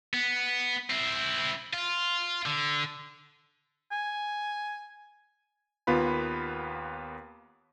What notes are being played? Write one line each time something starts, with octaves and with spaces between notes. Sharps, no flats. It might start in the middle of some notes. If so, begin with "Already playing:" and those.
B3
C4 E4
F4
D3
G#5
D#2 A#3 B3 F4 B4 B5